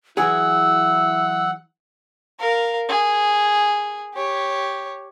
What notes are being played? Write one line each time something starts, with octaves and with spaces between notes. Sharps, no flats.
E3 F#3 E4 G#4 F#5 E6
A#4 F5
G#4
G4 C#5